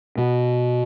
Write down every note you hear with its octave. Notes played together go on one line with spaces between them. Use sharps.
B2